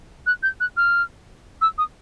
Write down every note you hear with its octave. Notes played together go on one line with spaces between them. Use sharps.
F#6
G6
F#6
F6
E6
D#6